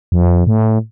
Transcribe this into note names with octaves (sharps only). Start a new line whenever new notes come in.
F2
A2